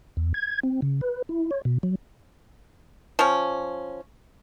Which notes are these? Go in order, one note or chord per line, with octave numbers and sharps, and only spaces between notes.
E2
G#6
C4
C#3
B4
E4
C#5
B2
F#3
F3 C#4